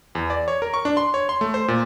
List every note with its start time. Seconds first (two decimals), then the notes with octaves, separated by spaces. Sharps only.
0.15 E2
0.30 D5
0.48 C#5
0.62 A#4
0.74 C#6
0.85 D4
0.97 C6
1.14 C#5
1.29 C6
1.41 A3
1.54 C5
1.68 A#2